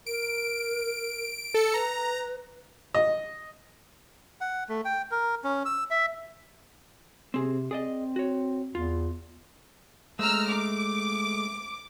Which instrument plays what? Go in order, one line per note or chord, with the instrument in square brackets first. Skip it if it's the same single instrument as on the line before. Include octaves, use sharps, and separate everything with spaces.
[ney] A#4 [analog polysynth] D7
[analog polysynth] A4 C#7
[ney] B4 [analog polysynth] A#5
[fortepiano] D#5
[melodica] F#5
A3
G5
A#4
C#4
E6
E5
[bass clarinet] C3 [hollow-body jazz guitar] C4 G#4
[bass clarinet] C4 [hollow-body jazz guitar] G#4 D5 D#5
[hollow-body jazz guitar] F#4 C#5
[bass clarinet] E2 [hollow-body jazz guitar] F4
[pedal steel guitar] G#3 A3 [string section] A#5 E6 F6
[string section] D6